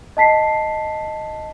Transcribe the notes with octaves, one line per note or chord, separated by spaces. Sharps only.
D#5 A5 B6 C7